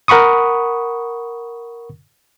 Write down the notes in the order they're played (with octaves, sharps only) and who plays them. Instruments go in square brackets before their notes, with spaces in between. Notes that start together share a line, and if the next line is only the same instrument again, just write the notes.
[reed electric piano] A#4 F#5 B5 C#6 D#6